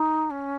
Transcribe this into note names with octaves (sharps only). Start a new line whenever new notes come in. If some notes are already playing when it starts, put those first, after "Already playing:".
Already playing: D#4
C#4